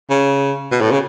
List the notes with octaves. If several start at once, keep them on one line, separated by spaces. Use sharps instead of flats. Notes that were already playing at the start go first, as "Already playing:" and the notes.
C#3
B2
A2
C#3